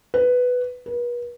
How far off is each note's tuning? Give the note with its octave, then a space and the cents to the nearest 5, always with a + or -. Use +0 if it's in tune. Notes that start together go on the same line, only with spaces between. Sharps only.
B4 +5
B4 -40